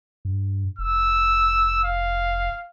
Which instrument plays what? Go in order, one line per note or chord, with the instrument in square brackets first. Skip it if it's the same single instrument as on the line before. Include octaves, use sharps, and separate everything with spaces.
[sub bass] G2
[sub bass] F1 [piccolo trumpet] E6
[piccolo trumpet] F5